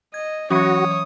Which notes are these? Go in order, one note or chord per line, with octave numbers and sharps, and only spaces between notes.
D#5 G#6
E3 F#3 C#4 F#4 C#5 D#6